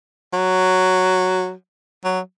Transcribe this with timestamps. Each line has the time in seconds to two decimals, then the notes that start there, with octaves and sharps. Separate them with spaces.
0.33 F#3
2.04 F#3